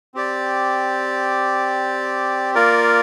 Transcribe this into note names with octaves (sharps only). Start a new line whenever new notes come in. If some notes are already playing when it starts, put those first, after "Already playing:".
C4 G4 D5
A#3 F4 A#4 D5